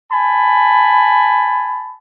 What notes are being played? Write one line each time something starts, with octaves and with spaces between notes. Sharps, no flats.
G#5 A5 B5